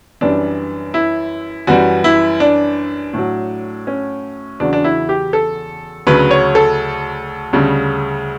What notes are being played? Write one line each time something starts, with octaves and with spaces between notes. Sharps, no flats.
F#2 E3 G3 D4
E4
F#2 E3 G3 F#4
E4
D4
A2 F#3
C#4
E2 C#3 F#3 D4
D4
E4
G4
A4
D2 C#3 F#3 B4
C#5
A4
D2 C#3 G3